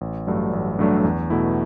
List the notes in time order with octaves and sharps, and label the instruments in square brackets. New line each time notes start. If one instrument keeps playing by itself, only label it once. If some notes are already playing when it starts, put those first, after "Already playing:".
[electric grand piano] A1
G2 F#3 A3 D4
A1
G2 F#3 A3 D4
E2
B2 A3 E4